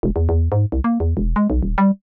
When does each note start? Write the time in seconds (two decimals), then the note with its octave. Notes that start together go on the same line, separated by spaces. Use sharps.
0.03 E1
0.16 E2
0.29 E2
0.52 G#2
0.72 C2
0.84 A#3
1.00 E2
1.17 E1
1.36 G#3
1.50 B1
1.63 D#1
1.78 G3